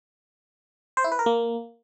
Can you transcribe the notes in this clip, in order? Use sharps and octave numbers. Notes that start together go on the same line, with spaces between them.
C5
E4
B4
A#4
A#3